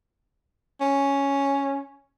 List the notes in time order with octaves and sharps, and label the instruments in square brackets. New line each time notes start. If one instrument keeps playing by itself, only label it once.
[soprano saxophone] C#4